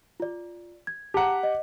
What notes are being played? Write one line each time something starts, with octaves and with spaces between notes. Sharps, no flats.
F4 D5
G#6
G4 F#5 A5 A#5
D#5